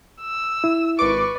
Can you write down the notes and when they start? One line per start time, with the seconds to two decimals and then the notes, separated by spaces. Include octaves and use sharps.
0.21 E6
0.64 E4
0.99 G#1 B4 D5 C#6 D6